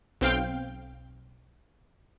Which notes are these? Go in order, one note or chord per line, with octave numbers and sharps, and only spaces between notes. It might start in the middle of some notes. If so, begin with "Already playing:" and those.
B1 C4 F5 G5